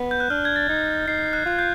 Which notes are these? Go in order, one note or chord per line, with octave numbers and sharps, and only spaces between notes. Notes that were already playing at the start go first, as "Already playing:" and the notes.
Already playing: B3
G6
F#6
D4 F6
G#6
A6
D#4
D#4 C7
F#6
F4 F#6
G6